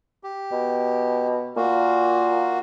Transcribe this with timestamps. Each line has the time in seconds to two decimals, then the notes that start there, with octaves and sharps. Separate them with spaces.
0.23 G4
0.52 B2
1.56 A#2 A#3 F#4